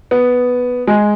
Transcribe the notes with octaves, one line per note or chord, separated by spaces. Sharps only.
B3
G#3